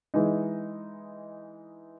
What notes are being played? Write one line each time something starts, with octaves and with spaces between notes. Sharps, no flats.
E3 G#3 D#4